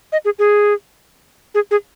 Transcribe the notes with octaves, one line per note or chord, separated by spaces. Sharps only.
D#5
G#4
G#4
G#4
G#4